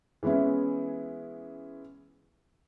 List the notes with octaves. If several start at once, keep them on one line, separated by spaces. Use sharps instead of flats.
E3 G#3 B3 C#4 E4